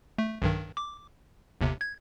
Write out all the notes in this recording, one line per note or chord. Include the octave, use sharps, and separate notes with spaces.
A3
B1 G2 D#3
D6
G1 D#2 C3
G#6